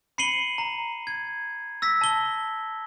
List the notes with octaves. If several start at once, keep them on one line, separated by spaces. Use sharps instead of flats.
B5 C7 C#7 D#7 F#7 G7
A#5
G#6
E6 A#6 B6
A5 G7